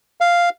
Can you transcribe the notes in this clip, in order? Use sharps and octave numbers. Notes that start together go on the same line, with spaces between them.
F5